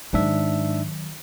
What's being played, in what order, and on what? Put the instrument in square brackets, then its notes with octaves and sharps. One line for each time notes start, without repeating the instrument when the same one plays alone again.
[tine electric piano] G#2 D4 E5 [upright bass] D#3 F#3